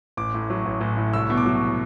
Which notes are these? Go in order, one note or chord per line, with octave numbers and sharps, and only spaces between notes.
A1 D6
A2
F#3
A1
A1
A2
C2 E6
B2
D6
F#3